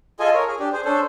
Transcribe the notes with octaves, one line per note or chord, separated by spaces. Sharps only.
F4 G#4 A4 D#5 G#5
A#4 C#5
G#4
D4 G4
G#4 C5
C#4 D4 A4 C5